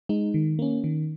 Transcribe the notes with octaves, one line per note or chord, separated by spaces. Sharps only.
G#3 D#4
D#3
A#3 C#4
D#3